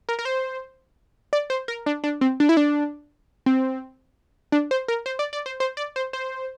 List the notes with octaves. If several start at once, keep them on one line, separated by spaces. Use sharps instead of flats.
A#4
A#4
C5
D5
C5
A#4
D4
D4
C4
D4
E4
D4
C4
D4
C5
A#4
C5
D5
D5
C5
C5
D5
C5
C5